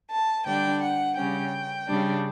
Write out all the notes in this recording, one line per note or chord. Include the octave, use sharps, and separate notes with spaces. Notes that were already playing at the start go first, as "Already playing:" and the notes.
A5
D3 G3 D4 G5
F#5
C#3 G3 C#4 G5
C#3 G3 D4